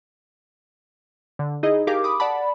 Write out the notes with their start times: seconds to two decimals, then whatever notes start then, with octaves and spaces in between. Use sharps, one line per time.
1.39 D3
1.63 D#4 E4 G#4 D#5
1.87 G4 G#4 A#4 F5 D6
2.04 B5 D6 D#6
2.20 D5 F#5 A5 B5